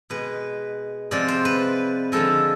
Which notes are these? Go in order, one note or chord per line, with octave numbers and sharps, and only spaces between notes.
B2 G#3 B4
C3 F3 G#3 D5
C5
B4
D3 F3 G#3 A4